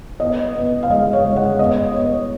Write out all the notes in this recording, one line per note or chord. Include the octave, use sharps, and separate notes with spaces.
B3 D#5
B3
F5
G#3 D#5
C#5
G#3
F#5
B3 D#5
B3 C#5